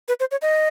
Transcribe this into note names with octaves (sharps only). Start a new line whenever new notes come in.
B4
C5
C#5
D#5